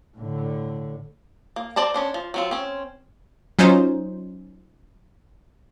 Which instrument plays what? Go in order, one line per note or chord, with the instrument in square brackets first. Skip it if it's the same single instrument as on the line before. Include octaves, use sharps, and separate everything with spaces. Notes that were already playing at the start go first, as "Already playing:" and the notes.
[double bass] A2 D3
[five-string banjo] A#3
C4 C5 D5 A5 A#5
C#4 D4 C5
F3
F#3 C4 F4
C4 C#4
[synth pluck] F#3 C#4 D#4 F4 C5